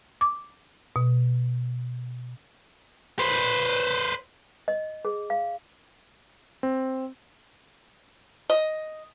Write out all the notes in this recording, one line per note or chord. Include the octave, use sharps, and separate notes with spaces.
D6
B2
B4 C5
D#5
G#4
F5
C4
D#5